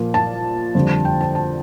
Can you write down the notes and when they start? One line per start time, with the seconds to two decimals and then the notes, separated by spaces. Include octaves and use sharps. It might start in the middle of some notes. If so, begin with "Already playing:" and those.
Already playing: A#2 F3 A#3
0.14 A5
0.75 F2 D3 G3
1.05 G5
1.21 A5
1.35 A5